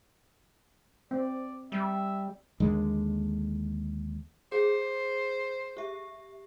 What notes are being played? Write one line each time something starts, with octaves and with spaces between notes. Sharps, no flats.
C4 D5
G3 E5
D#2 D3 G#3
G#4 C5
G4 E5